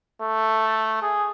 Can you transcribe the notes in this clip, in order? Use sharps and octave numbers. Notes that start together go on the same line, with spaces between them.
A3
G#4